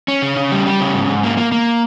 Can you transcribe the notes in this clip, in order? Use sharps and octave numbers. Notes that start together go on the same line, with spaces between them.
C#4
C#3
C#3
G3
G3
C#3
G#2
G#2
A#3
A#3
A#3